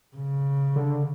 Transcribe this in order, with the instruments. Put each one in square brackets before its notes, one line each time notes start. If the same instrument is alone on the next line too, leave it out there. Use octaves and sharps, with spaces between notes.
[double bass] C#3
[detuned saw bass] D3